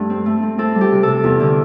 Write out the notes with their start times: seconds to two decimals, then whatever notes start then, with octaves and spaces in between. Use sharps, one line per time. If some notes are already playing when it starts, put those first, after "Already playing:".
Already playing: G2 A3 A4
0.10 C4
0.26 A3
0.42 C4
0.58 C4 A4
0.75 G3
0.81 G4
0.92 C3
1.03 A4
1.08 C3
1.24 E2
1.40 D3